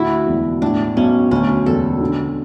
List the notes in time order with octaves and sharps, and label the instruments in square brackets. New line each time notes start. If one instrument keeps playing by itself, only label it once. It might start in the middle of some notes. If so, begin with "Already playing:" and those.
Already playing: [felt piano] D2 [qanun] E4 F#4
[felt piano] E1
[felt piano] A2 [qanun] D4
[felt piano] B1 [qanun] C#4
[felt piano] D2 [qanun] C#4
[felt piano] E1 [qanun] A4
[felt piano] D3